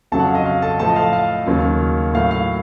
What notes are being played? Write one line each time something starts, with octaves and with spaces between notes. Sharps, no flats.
F2 C#3 F#3 A4 A5
F#5
F5
D#5
F5
A4 A5
A2 F3 A4 A5
D#5
F5
F5
D#2 C#3 F#3
A2 F#3 F5
F5